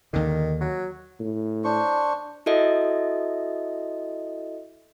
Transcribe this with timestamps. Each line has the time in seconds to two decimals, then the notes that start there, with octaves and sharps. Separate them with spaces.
0.13 D#2 D3 D#3
0.61 F#3
1.19 A2
1.64 D4 C5 C#6
2.46 E4 F#4 A4 D#5 E5